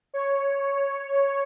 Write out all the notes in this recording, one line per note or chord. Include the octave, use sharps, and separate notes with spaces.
C#5